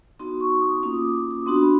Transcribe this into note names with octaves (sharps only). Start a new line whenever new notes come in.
B3 D#4 F#4 C6
C#6
D#6
A#3 C#4 F4 D#6
D6
D6
D#6
B3 D4 F#4 C6
B5